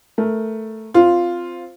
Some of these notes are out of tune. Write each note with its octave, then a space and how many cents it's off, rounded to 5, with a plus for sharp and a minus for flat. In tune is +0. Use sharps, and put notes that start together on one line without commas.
A3 +0 A#4 +0
C4 +0 F4 +0